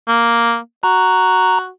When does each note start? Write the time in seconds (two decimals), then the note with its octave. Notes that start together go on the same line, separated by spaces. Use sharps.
0.08 A#3
0.83 F#4 A#5